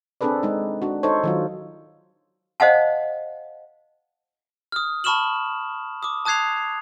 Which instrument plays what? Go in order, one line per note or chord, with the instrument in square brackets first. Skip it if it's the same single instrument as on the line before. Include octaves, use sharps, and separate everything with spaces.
[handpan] C4 D4 G#4 A4 B4 D5
G#3 D#4
D4 F#4
D#4 A4 C5 C#5
D#3 F#3 F4
[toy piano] C5 D#5 F5 F#5 A5
[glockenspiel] D#6 F6
A5 B5 C#6 F6 E7 F#7
D6 D#6
A5 D#6 F#6 G#6 C7 F7